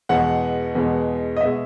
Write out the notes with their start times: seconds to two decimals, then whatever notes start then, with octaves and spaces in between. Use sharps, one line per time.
0.09 E2 B2 G#3 F#5
0.75 E2 B2 G#3
1.36 D#5
1.41 B2 G#3 E5